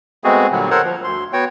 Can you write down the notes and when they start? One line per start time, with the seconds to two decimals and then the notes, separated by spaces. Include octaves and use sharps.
0.24 G#3 A3 B3 C4 F#4 G#4
0.52 A#2 D3 F#3 G3
0.71 A4 A#4 C5 C#5 F#5
0.84 F3
1.04 D2 C6
1.33 B3 F#4 C#5 G5